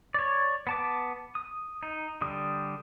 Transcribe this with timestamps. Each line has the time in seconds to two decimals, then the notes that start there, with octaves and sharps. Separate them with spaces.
0.14 C#5 D5
0.67 B3 A5 D6
1.35 D#6
1.83 D#4
2.21 D3 G3 D#6